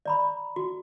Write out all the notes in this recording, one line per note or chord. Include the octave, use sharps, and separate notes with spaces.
D5 A#5 B5
F#4